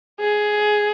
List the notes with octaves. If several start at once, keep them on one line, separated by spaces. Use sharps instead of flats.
G#4